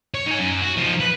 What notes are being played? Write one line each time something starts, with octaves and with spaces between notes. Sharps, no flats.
C#5
D#4 G#5
F#2
F#4
F3 D#4
B4